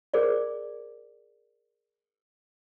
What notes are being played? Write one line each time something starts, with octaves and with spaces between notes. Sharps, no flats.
G#4 A#4 C5 D5